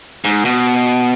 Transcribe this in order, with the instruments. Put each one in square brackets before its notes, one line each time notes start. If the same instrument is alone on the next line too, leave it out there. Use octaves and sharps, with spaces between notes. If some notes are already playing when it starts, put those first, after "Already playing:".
[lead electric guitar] G#2
B2